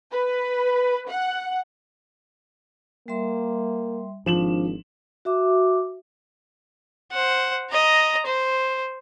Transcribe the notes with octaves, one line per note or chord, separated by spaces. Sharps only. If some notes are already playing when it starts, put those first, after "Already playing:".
B4
F#5
G3 A#3 E5 C6
G#1 F3 D4 E7 F#7
F#4 E5 D6
C5 F#5
D#5 A#5
C5